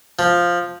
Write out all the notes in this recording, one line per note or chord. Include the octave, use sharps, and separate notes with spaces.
F3